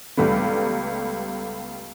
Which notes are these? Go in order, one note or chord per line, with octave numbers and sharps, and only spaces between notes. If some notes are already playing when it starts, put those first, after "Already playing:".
C#2 G3 A3 B3